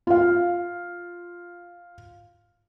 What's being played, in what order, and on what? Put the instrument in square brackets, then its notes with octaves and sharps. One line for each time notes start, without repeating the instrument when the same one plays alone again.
[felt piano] F4 F5